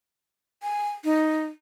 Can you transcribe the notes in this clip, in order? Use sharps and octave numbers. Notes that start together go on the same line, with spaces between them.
G#5
D#4